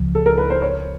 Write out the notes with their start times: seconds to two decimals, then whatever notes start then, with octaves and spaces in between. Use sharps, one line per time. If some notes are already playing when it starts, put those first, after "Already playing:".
Already playing: C#2 C#3 F3
0.15 A4
0.26 A#4
0.38 B4
0.50 C5
0.62 C#5